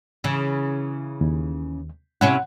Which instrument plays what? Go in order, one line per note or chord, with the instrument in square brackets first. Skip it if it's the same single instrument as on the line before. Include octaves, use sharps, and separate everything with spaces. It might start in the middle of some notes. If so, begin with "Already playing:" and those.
[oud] C#3 E3
[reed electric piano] D#2
[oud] C3 C#4 E4 [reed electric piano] F#5